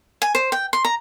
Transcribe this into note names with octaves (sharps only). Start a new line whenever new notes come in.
G#5
C5
G5
C6
A#5